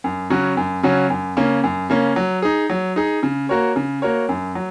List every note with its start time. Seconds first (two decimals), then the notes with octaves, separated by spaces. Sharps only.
0.04 F#2
0.30 C#3 F#3 C#4 F#4
0.57 F#2
0.83 C#3 F#3 C#4 F#4
1.10 F#2
1.37 C#3 A#3 C#4
1.64 F#2
1.90 C#3 A#3 C#4
2.16 F#3
2.42 D#4 G#4
2.69 F#3
2.96 D#4 G#4
3.23 C#3
3.49 A#3 F#4 A#4 C#5
3.76 C#3
4.02 A#3 F#4 A#4 C#5
4.29 F#2
4.55 F#3